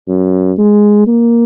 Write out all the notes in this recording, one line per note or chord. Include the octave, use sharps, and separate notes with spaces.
F#2
G#3
A#3